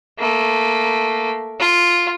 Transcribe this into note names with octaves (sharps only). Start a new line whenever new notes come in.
A3 A#3
F4